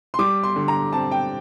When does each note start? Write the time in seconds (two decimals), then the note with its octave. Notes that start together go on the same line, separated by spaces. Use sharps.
0.14 C6
0.19 G3 D6
0.43 C6
0.56 D3
0.68 A#5
0.93 C4 A5
1.12 G5